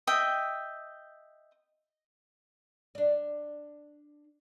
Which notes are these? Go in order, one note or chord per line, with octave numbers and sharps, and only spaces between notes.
D#5 E5 G5
D4 D5